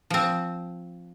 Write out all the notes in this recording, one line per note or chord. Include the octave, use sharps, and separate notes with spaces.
F3 C4